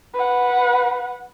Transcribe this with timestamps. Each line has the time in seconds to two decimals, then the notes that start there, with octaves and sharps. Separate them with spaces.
0.14 B4 F#5